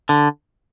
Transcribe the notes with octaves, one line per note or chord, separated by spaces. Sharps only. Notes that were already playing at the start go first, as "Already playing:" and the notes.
D3